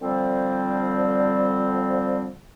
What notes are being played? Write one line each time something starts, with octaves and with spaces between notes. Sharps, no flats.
D3 F3 G3 C4